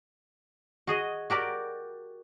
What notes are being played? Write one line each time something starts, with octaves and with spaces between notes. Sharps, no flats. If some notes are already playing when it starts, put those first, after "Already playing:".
F#4 G#4 D#5
F#4 G4 A#4 D5